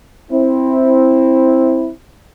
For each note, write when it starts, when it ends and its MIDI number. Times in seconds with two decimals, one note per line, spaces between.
0.31 1.91 60
0.31 1.91 64